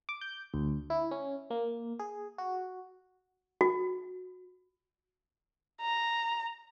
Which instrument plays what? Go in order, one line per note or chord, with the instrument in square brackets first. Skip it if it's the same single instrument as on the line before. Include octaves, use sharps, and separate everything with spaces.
[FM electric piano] D6
G6
D2
E4
C#4
A#3
G#4
F#4
[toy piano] F#4
[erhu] A#5